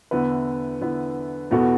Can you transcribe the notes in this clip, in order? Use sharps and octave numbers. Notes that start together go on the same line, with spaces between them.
E2 D3 B3 E4 B4
E2 D3 B3 E4 B4
E2 B2 B3 F#4 A4